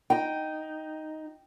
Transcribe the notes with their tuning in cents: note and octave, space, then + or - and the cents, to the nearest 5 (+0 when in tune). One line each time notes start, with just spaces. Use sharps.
D#4 +0 G5 +0